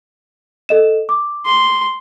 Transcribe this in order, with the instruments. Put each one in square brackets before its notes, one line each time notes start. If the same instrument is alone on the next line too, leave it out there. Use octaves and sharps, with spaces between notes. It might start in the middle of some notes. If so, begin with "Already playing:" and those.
[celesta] A4 D#5 E7
D6
[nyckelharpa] C6